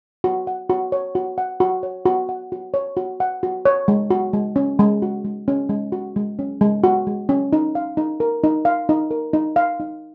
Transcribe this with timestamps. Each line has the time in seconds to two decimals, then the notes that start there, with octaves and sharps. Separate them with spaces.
0.24 F#4
0.47 F#5
0.70 F#4
0.92 C#5
1.15 F#4
1.38 F#5
1.60 F#4
1.83 C#5
2.05 F#4
2.29 F#5
2.52 F#4
2.74 C#5
2.97 F#4
3.20 F#5
3.43 F#4
3.65 C#5
3.88 G#3
4.10 F#4
4.33 G#3
4.56 C#4
4.79 G#3
5.02 F#4
5.25 G#3
5.48 C#4
5.69 G#3
5.92 F#4
6.16 G#3
6.39 C#4
6.61 G#3
6.84 F#4
7.07 G#3
7.29 C#4
7.53 D#4
7.75 F5
7.97 D#4
8.20 A#4
8.44 D#4
8.65 F5
8.89 D#4
9.11 A#4
9.33 D#4
9.56 F5
9.80 D#4